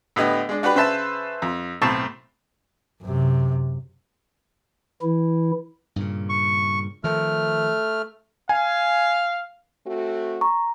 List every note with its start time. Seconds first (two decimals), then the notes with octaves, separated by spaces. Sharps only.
0.16 A2 D3 B3 G4 D#5
0.49 G#3 D4
0.63 D4 F#4 G4 B4 B5
0.75 C#3 B4 C5 E5 A5
1.42 F2
1.82 B1 A2 C4 A5 C#6
3.02 F#2 C3
5.02 E3 E4
5.96 G2 A#2 C#3
6.29 C#6
7.04 D#3 F3 A3 F6
8.49 F5 G#5
9.86 A3 C4 F#4
10.41 A#5 C#6